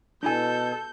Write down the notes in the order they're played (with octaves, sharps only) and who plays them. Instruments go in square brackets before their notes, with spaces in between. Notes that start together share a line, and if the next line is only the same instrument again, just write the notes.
[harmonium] B2 [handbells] D4 E4 G#5 [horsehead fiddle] A4 [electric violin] G6